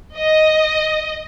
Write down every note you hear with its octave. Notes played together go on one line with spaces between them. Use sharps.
D#5